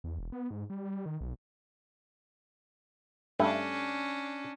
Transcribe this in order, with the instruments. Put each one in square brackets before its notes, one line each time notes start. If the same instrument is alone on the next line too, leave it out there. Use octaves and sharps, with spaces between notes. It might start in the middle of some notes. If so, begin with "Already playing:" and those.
[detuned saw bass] E2
E1
B3
G#2
G3
G3
D#3
B1
[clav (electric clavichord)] G2 A3 [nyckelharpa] C#4 D4